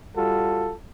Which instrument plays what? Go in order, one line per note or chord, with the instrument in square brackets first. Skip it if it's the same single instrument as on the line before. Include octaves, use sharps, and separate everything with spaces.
[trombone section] G3 F4 F#4 A4